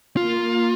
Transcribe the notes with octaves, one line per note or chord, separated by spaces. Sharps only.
A#3 F4